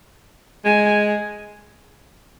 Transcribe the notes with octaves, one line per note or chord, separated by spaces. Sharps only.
G#3 G#5